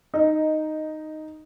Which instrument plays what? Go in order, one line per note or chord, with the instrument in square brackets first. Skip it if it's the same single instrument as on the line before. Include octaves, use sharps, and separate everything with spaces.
[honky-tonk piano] D#4